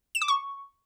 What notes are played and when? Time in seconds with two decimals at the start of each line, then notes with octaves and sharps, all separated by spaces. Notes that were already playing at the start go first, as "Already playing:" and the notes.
0.15 E7
0.22 D6
0.28 C#6